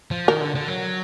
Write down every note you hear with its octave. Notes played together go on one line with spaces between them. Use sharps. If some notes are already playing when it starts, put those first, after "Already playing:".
F3
D#3 A#4
D3
D3
F#3